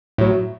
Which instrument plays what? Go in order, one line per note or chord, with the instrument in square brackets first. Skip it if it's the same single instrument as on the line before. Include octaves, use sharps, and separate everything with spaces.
[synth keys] A2 F#3